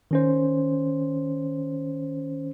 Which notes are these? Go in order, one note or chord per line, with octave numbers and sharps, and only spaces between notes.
D#3 C#4 C5